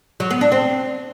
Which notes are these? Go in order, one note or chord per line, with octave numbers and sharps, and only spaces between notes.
F#3
B3
D4
C4